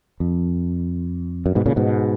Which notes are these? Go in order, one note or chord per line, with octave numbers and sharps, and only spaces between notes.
F2
F#2
G#2 B2
A#2 C#3
G#2 B2